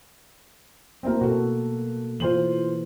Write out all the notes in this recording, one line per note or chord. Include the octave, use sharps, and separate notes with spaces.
A3 A#3 C4 E4 F#4 A#4
B2 F#4 A4
E3 F4 C5 F#7